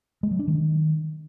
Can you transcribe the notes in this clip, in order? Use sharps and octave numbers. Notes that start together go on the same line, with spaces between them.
G#3
F#3
D4
D#3